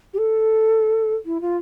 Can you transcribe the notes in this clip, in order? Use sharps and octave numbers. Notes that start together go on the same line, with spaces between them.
G4
A4
E4
F4